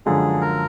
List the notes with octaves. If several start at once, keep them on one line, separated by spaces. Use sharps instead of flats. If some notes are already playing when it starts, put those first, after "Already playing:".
F#2 D3 F3 G#3 G#4
A#4